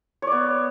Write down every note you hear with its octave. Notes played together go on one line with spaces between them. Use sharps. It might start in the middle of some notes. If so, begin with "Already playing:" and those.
B3 C#5 D5